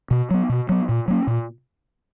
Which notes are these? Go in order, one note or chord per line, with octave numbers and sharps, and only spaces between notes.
B2
F#3 B3
B2
F#3 B3
A#2
F#3 A#3 C#4
A#2